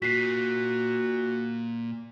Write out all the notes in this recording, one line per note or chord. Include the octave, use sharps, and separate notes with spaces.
A#2 F#4 B6 C7